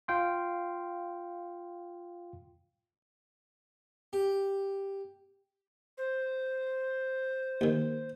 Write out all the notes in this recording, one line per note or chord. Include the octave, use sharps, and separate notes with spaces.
F4 F5 G5 C6
G4
C5
D#2 D#3